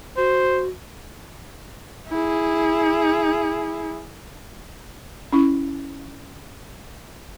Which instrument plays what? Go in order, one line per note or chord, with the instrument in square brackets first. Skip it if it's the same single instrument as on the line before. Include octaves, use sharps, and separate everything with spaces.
[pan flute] F#4 [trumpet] C5
[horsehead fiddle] E4 G#4
[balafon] C#4 E4